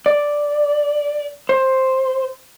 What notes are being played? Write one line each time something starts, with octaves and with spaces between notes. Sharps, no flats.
D5
C5